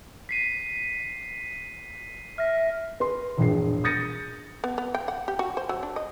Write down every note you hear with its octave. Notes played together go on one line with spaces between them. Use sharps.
B6 C7 D#7
E5 F6 A#6
B4 C6
E1 A#1 G2 G#4 C7
D#6 G6 A6 A#6 C#7 D#7
B3
B3
G5
F#5
G4
F#4
C5
F#3
D4
D#5